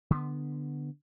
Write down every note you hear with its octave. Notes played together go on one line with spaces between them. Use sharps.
D3 B3